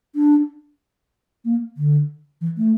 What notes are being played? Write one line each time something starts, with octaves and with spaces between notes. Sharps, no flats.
D4
A#3
D3
E3
A3